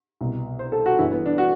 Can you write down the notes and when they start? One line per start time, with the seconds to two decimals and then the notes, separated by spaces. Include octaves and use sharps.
0.21 C2 B2
0.59 C5
0.72 A4
0.86 F#4
0.99 G1 G2 E3 E4
1.11 B3
1.26 D4
1.38 F#4